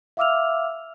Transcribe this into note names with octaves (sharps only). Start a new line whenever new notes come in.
E5 F5 D6 E6 F6 F7